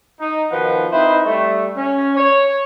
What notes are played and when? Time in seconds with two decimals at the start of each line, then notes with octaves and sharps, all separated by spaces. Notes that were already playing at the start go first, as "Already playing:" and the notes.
0.20 D#4
0.51 B2 D#3 F3 B4 F#5
0.92 C4 D#4 E4 B4 C5
1.25 G3 A3
1.76 C#4
2.17 C#5